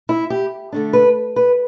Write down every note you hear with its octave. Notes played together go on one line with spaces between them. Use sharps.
E4
G4
D3 A3 D4
B4
B4